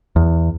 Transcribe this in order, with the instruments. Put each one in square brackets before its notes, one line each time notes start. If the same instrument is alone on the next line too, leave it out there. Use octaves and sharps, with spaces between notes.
[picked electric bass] E2